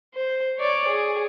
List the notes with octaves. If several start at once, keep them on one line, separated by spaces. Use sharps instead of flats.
C5
C#5 D5
G#4